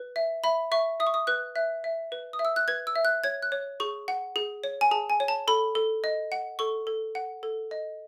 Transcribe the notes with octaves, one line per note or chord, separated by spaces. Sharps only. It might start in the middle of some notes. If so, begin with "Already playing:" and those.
Already playing: B4
E5
E5 B5
E5 C#6
E5 D#6
C#6
D#6
B4 F#6
E5 F#6
E5
B4
D#6
E5
E6
F#6
B4 G#6
E6
E5
F#6
C#5 G#6
F#6
C#5
G#4 C#6
F#5
G#4
C#5
G#5
G#4 A5
G#5
C#5
A5
A4 B5
A4
D#5
F#5
A4 C#6
A4
F#5
A4
D#5